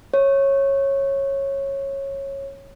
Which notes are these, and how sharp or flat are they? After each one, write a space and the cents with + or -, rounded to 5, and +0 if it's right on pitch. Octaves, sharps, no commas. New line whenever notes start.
C#5 -15